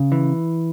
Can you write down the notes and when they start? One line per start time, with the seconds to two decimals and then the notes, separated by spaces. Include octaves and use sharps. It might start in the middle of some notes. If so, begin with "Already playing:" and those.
Already playing: C#3
0.12 E3